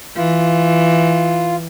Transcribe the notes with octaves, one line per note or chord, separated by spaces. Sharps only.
E3 F4